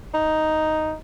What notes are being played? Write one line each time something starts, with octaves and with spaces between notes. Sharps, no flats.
D#4